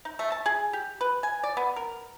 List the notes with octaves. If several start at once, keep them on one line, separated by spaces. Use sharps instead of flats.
D#4
A3
A5
G#4
G4
B4
G#5
D5
B3
A#4